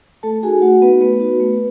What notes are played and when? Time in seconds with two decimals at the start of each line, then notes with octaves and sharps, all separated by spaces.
0.23 A3 A4 A5
0.43 D#4 F#4 G#4 G#5
0.62 A3 F#4 F#5
0.82 B3 D#4 F#4 B4
1.01 A3 B3 B4
1.20 D#4 F#4
1.40 A3